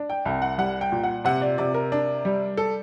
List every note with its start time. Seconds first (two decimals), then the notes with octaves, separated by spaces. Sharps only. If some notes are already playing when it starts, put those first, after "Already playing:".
Already playing: D4
0.10 G5
0.25 C2 G5
0.42 F#5
0.58 G3 F#5
0.81 G5
0.92 A#2
1.03 F#5
1.25 C3 F#5
1.42 D5
1.58 C3 D5
1.74 A#4
1.92 D4
2.25 G3
2.57 A4